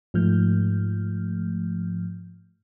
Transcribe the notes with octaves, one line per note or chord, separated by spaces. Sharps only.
G#2 F3 A3 F6 G6